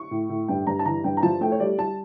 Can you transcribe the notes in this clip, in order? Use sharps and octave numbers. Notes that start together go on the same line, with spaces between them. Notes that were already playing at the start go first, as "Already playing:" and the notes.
Already playing: C#6
A2
A2
G2 G5
G2 A#5
A5
E3 A#5
G2 G5
A#5
F3 A5
A3 G5
C#5
G3 D5
G3 A5